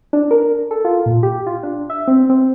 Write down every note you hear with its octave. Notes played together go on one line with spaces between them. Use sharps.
D4
A#4
A4
F4
A#2
G4
F4
D4
E5
C4
C4